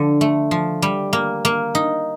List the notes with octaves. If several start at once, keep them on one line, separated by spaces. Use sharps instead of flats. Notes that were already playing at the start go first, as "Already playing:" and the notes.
Already playing: D3 F3
A3
F3
G3
A#3
A#3
D#4